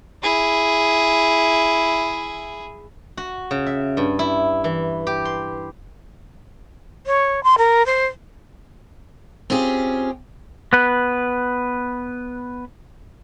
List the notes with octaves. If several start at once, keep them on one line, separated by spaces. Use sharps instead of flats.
E4 G#4
F#4
C#3
E5
G2
E4
E3
G4
C6
C#5
C6
A#4
C5
C4 C#4 F4 G4 G#4
B3 B4